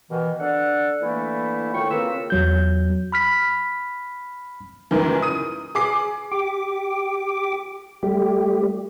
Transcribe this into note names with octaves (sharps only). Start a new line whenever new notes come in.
B2 D#3 E3
D4 A4 F#5
D3 E3 A3 A#3 E4
D2 A2 D#3 F4 G5 C#6
C#3 A#3 C4 F4 B4 E6
E2 F#3 G6
B5 F6 B6
C#2 F#2 D#3 E3
D#6 D#7
G#4 D6 C7
G4 D6
G3 A3 G4